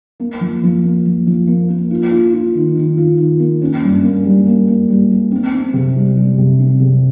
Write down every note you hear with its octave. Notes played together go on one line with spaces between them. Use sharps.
A#3
F3
F3
A#3
F3
F3
A#3
A#3
F4
F4
F4
D#3
D#3
F4
D#3
A#3
C#4
G2
A#3
G3
A#3
A#3
G3
G3
C4
C4
C3
G3
G3
C3
C4
C3